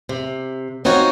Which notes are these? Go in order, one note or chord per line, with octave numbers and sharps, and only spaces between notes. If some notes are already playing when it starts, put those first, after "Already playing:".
C3
C4 D#4 F4 F#4 C#5